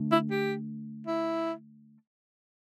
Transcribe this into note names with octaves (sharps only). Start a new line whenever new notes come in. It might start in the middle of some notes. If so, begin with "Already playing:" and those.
Already playing: D3 A3 D4
E4
G4
E4